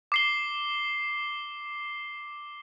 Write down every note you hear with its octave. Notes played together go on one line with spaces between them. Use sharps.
D6 C7 G7